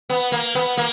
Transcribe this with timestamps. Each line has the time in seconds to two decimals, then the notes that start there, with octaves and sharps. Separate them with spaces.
0.10 B3
0.32 A#3
0.55 B3
0.77 A#3